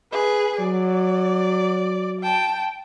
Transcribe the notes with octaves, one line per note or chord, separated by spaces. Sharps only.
G#4 B4
F#3 D5
G5 A5